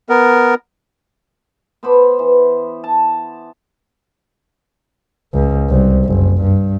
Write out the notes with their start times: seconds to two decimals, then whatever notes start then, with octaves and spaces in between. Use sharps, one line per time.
0.09 B3 A#4
1.83 B3 C5 B5 D6
2.19 E3
2.84 A5
5.34 C#2
5.69 C2
6.05 F#1
6.42 G2